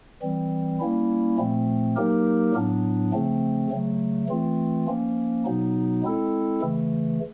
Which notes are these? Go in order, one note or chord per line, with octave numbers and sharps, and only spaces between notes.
E3 G3 C4
G3 A#3 C#4 E4
A#2 F3 A3 C4
F#3 A#3 D#4 G4 A#4
A2 F#3 B3 D4
C#3 F3 A3 C4
C#3 F#3 A3
E3 A3 C4 F4
F3 A#3 C#4
B2 F#3 B3 D#4
G#3 C4 E4 A4
C#3 E3 A3